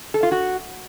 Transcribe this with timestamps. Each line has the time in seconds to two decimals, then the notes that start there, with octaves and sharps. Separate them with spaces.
0.14 A4
0.23 F4
0.32 F#4